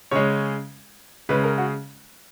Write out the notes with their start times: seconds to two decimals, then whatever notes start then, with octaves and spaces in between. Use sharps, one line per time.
0.11 C#3 G#3 C#5
1.29 C#3 G#3 B4
1.43 A#4
1.58 F#4